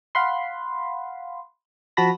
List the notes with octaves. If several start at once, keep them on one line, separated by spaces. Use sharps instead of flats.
F5 F#5 B5 C6
F3 F#4 A5 B5 A#6